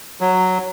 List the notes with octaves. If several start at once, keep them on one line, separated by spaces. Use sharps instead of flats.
F#3